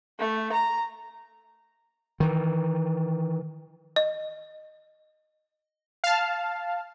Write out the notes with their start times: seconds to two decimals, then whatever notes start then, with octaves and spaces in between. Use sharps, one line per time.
0.19 A3
0.52 A#5
2.20 D#3 E3
3.96 D#5
6.04 F5 A5